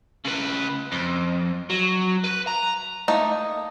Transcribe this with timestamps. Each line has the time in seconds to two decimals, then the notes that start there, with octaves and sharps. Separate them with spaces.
0.25 C#3 B4
0.92 F2
1.70 F#3
2.24 B4
2.47 A#5
3.08 A3 A#3 D#4